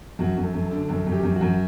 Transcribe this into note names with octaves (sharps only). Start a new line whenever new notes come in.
F#2 F#4
F#2
A4
F#2
A4
D3
F#2 A4
F#2
G4
F#2
F#4
F#2